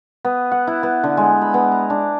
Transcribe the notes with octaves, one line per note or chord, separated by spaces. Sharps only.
B3
F#5
E4
B3
D3
G#3
B5
B3
A#5
D4